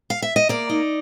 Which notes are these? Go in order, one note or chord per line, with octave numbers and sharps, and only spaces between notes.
F5
E5
D#5
A#3 D5
D#4